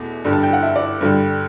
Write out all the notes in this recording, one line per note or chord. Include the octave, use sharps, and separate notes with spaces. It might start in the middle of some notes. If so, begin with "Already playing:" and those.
Already playing: E2 B2 A3
G2 D3 G3
A5
G5
F#5
E5
D5
G2 D3 G3